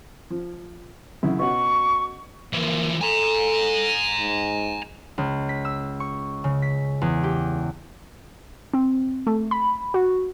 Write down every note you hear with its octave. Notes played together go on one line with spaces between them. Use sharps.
F3
F#2 C#3 E4
B2 C#4 F#4 C#6
E3 F3 A#3
A4 G#5 A#5
G#2
C#2
B6
E6
C#6
C#3
B6
E2
G4
C4
A3
B5
F#4